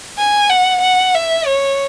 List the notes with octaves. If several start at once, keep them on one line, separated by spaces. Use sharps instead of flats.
G#5
F#5
F#5
E5
C#5